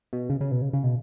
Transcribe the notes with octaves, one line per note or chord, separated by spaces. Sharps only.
B2
C#3
C#3
B2
C#3
C#3
B2